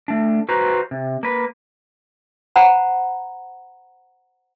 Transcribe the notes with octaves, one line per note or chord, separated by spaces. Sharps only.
A3 D4
F#4 B4 C5 A#5
C3
A#3 B4
C5 F#5 A#5 B5